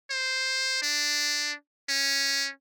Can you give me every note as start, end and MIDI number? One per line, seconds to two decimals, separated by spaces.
0.10 0.78 72
0.82 1.53 62
1.89 2.49 61